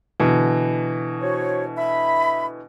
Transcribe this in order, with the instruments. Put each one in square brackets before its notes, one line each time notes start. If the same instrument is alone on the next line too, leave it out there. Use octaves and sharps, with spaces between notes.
[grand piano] B2 D3 E3
[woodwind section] F#4 C5 C#5
E5 B5